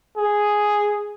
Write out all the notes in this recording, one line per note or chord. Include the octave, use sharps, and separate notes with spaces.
G#4